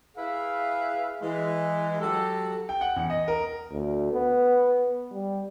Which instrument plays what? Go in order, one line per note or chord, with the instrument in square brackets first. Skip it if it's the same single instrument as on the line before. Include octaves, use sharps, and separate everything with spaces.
[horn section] E4 G#4 B4 E5 F5
E3 G#3
F#3 G4 A4
[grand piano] G5
F#5
E2
D#5
A#4
[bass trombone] D2
B3
G3